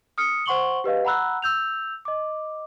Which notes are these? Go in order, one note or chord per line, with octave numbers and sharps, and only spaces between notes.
D#6 F6 C#7
C5 F#5 C6 C#6 F#7 G7
G4 B4 D#5 F5
F#5 A#5 B5 E6 F#6
E6 G6 F7
D#5 D6